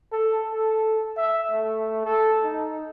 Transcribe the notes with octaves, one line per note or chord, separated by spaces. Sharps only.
A4
A4
E5
A3
A4
D#4